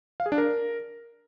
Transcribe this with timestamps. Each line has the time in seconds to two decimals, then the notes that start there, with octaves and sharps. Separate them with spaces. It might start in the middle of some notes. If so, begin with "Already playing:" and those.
0.20 F5
0.26 G#4
0.32 D4
0.38 A#4